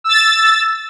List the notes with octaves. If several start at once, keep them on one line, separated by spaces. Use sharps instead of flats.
E6 A6